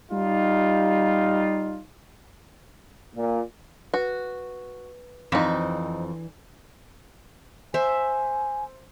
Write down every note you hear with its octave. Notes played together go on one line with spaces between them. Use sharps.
G3 D#4 F4
A#2
F#4 B4
F2 E3 C4 D4 D#4
C5 E5 G#5